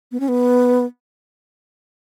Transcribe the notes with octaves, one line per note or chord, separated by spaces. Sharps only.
B3
C#4
B3